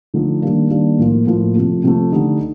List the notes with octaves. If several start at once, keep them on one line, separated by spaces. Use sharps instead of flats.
D3 F3 A3 D#4
D#3 G3 A#3 D4
D#3 G3 A#3 D4
A2 F3 A#3 F4
A2 F3 A#3 F4
C3 F3 A3
C3 F3 A3
D3 A3 D#4 G4